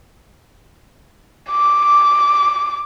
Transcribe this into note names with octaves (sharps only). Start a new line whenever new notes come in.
D6